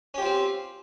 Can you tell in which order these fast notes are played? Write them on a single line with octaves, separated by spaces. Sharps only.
C#4 G4 F4 C4